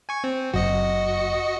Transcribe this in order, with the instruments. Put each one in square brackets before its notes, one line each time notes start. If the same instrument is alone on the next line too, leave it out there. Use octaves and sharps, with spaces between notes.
[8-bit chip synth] G#5 C#6
C4
[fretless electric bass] F#1 [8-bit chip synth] F#4 D#5 C#7